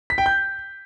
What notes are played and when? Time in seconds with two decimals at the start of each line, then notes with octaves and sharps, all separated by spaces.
0.10 B6
0.18 G5
0.26 G6